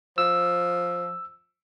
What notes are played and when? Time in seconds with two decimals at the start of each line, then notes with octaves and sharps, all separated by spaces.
0.18 F3 E6